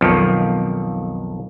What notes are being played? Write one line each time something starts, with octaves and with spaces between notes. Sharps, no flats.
B1 F2 D#3 F3